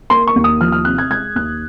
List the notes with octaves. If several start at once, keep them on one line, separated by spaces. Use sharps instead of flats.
A#3 C6
C#6
D#2
D#6
F3 F6
F6
C3 F#6
G#6
G#3 G#6
D#2 F#6